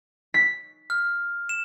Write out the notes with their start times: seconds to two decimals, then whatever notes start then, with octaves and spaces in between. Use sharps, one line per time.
0.34 B6
0.90 F6
1.49 E7